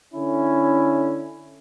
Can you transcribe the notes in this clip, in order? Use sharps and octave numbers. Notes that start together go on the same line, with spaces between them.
D3 C#4 E4